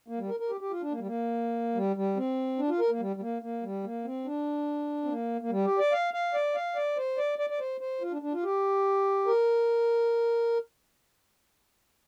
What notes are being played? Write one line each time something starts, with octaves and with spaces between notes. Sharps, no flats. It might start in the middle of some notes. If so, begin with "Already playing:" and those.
A#3
G3
A#4
A#4
G4
G4
F4
D4
A#3
G3
A#3
G3
G3
C4
D4
F4
A#4
A#3
G3
G3
A#3
A#3
G3
A#3
C4
D4
C4
A#3
A#3
G3
G4
D5
F5
F5
D5
F5
D5
C5
D5
D5
D5
C5
C5
F4
D4
D4
F4
G4
A#4